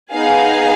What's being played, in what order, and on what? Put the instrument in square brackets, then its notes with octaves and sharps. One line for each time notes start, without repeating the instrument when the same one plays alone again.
[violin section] B3 D#4 G#4 F5 G#5